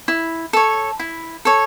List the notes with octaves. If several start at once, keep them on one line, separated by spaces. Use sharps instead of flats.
E4
A4 C#5
E4
A4 C#5